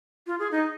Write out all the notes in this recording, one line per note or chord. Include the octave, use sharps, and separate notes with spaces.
F4
G#4
D#4